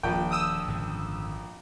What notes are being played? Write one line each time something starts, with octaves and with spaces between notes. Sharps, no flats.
D#1 A#1 G5
D#6 E6
G#1 F#2 D3